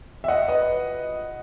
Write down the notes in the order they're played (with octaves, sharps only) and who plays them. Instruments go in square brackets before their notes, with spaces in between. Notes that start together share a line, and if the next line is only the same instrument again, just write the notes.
[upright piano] E5
D#5 F#5
B4 D#5